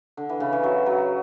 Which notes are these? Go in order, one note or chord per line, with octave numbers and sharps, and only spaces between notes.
D3
E3
C#3
E3
F#3
F#3